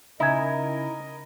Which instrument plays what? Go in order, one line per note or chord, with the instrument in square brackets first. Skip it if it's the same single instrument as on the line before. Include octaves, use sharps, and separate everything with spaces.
[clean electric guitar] C#3 [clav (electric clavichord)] D#4 G#5 [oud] E4 [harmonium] A#4 D#5